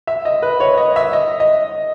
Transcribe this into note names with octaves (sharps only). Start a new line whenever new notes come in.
E5
D#5
B4
C#5
D#5
E5
D#5
D#5